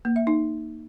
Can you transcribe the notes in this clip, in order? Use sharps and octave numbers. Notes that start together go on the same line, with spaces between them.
A#3
E5
D#4